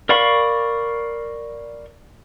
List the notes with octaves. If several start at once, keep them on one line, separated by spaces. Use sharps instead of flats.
A#4 D5 F5 B5 C#6